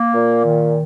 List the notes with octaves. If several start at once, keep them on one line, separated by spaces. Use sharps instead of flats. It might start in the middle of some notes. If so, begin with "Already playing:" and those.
Already playing: A#3
A#2
D#3